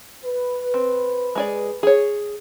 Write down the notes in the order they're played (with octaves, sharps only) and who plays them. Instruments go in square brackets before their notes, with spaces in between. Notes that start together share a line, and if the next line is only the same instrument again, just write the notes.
[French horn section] B4
[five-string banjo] C4
G#3 G#4 D5
G#4 C#5